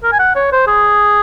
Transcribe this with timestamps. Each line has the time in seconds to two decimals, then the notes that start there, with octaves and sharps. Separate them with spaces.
0.03 A#4
0.12 G#5
0.19 F#5
0.35 C#5
0.52 C5
0.67 G#4